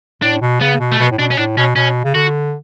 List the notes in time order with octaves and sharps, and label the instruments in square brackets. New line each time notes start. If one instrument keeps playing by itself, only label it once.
[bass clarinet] A2 [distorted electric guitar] D4
[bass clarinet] B2
[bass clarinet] C#3 [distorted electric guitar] B3
[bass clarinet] B2
[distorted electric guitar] A3
[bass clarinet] B2 [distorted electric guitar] B3
[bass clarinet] A2
[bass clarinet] B2 [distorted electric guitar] D4
[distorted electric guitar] C#4
[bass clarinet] A2 [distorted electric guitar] D4
[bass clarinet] B2 [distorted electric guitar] C#4
[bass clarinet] B2 [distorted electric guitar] C#4
[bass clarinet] C#3
[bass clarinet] D3 [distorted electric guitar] F#4